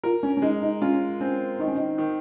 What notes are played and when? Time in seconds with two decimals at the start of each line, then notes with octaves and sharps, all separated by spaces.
0.03 F4 A#4
0.23 C#4
0.37 C#4
0.42 G#3 D#4
0.62 D#4
0.82 C#4 F4
1.20 C4 C#4
1.59 D#3 D#4
1.67 C#4
1.75 D#4
1.98 D#3